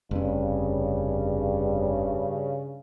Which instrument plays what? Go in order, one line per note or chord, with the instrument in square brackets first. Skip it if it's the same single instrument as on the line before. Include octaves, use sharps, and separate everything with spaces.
[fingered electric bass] F1 C#4 [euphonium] G2 [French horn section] C#3